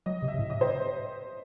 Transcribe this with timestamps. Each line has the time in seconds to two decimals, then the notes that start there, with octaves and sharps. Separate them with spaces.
0.06 F#3 D#5
0.22 C3
0.28 E5
0.34 C3
0.39 A2
0.50 D#5
0.61 C5